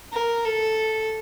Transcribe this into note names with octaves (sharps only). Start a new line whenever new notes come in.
A#4
A4